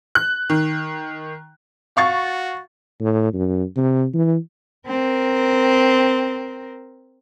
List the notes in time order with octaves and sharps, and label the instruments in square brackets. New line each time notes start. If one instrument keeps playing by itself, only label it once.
[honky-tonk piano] F#6
D#3
[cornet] F#4 [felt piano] F5 C#6 A6
[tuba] A2
F#2
C3
E3
[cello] C4 A#4